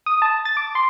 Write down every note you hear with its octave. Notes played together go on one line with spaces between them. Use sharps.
D#6
A5
A6
D6
C6